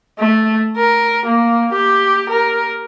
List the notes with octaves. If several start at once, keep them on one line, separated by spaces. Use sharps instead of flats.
A3
A#4
A#3
G4
A#4